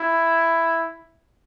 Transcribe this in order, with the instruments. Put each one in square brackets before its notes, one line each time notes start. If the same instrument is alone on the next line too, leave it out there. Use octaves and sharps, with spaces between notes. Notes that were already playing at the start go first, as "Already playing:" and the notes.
Already playing: [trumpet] E4